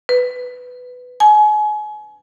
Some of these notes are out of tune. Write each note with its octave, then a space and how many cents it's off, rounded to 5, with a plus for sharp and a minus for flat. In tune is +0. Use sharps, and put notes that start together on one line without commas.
B4 +10
G#5 +35